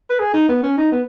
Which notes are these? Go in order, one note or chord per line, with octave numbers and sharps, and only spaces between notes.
B4
G#4
D#4
B3
C#4
D#4
B3